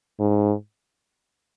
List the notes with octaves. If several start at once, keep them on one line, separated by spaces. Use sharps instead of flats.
G#2